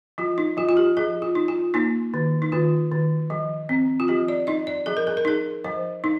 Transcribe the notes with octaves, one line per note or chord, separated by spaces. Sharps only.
F3 F4
D#4
F3 F4
F4
G4
F3 G#4
F4
D#4
F4
A#3 D#4
D#3
D#4
D#3 F4
D#3
F3
C4
F4
F3 G4
D5
D#4 D#5
D5
F3 G#4
A#4
G#4
A#4
D#4 G#4
F3 C5
D#4